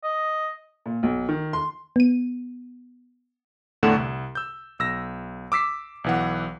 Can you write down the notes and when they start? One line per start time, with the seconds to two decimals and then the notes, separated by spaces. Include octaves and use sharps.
0.04 D#5
0.86 A#2
1.03 B1
1.29 D#3
1.53 C6
1.96 B3 D#7
3.83 E2 A2 D3 A3 F#5 E7
3.95 C2
4.35 E6 G6
4.79 B1 E6 A#6
5.52 D6 E6 B6 C7
6.04 B1 E3 F#5